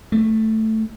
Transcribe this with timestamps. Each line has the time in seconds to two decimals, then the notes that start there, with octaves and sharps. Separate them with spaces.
0.12 A3